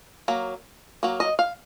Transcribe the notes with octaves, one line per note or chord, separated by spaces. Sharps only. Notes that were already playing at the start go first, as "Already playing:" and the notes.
F#3 A#3
F#3 A#3
D#5
F5